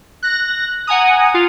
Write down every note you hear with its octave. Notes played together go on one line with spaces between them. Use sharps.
F#6 A#6
F#5 G#5 A#5 D#6
F4